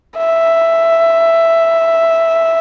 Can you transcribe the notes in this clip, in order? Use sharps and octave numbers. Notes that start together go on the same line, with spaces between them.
E5